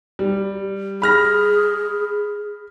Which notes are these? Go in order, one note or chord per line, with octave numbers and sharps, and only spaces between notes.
G3
G#4 B5 F6 A#6